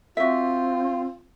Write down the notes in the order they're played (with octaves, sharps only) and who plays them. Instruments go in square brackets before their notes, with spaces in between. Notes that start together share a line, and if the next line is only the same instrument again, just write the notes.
[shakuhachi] C4 [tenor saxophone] F4 [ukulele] F#4 E5